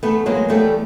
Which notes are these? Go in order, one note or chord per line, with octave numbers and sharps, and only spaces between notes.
E2 A3 B3
F#3 G#3 A#3
E2 G3 A3